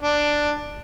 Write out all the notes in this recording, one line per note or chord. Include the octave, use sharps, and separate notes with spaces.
D4